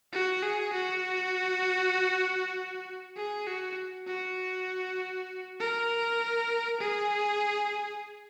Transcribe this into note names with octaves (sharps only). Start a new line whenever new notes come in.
F#4
G#4
F#4
G#4
F#4
F#4
A#4
G#4